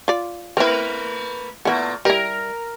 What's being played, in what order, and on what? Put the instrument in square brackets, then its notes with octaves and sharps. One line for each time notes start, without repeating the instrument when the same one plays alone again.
[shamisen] F4 D5
[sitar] A3 A#3 B4 [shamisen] C4 E4
[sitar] A#2 A3 [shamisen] B3 E4
[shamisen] G3 E4 [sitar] A#4